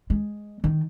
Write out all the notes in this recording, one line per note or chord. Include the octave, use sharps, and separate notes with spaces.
G#3
D#3